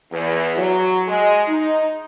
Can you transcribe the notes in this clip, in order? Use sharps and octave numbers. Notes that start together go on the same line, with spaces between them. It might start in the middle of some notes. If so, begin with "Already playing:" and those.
E2
F#3
G#3
D#4